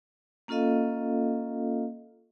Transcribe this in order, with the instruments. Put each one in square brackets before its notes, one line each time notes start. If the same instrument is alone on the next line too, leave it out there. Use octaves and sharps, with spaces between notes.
[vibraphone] A#3 C#4 F4 A4 D#5 F5